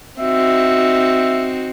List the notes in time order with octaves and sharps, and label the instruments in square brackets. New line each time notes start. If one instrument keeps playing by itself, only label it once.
[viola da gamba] C4 D#4 F#4 [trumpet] E5